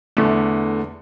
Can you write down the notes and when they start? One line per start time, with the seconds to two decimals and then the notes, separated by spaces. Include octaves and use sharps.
0.17 E2 D3 A3